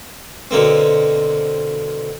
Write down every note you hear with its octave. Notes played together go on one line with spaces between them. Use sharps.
B2 D3 A#3 C4